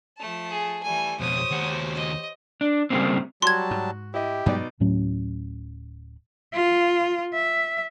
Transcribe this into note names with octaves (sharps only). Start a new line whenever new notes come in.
F3 A3 A5
G#4
E3 G3 A3 G#5
F2 B2 G4 C5 C#5 D#6
D#2 F#4
D#5
D4
C#3 G3 A3 A#3 C4
F#3 G3 F#4 A5 C6 G#6
G#2
E4 G4 D#5
G2 B2 F#3 G#3 D#4 D5
D1 A2 F#3 C#4
F4
E5